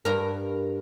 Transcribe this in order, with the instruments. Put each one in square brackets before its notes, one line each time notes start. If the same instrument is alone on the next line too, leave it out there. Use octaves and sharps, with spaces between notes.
[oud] G2 A#4